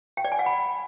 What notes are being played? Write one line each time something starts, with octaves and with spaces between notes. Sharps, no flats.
G5
D5
G#5
F#5
B5